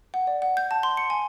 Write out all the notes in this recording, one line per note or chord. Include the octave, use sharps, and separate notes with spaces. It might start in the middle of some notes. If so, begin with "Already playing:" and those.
F#5
D5
F#5
G6
A5
C6
C#7
G#5